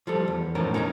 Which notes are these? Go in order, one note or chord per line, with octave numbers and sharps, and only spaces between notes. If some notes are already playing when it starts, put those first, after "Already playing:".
F3 G3 A4
E2
F#2 A2 F3 C#4 D#4 A#4
C#4 D#4 A#4 A5 A#5